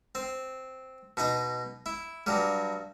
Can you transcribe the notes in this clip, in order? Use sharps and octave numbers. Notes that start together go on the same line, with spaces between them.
C4
B2 D#4 D#5
E4
G2 F#3 G3